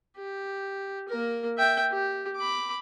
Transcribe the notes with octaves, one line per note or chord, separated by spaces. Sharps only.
G4
A#3 A#4
E5 G5
G4
B5 D6